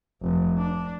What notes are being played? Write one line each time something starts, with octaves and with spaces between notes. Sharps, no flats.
F1
D4